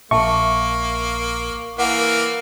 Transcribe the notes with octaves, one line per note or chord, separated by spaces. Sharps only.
A#1 A#3 E5 G#5 A5 C#6
E3 A#3 F#5